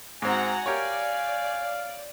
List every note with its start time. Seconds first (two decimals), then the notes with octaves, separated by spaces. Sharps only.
0.22 G#2 C4 F#4 F#5 G#5 A#5
0.66 G4 A#4 C#5 D5 F5